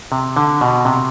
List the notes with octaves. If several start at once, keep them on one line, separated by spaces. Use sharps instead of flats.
C3
D3
B2
C3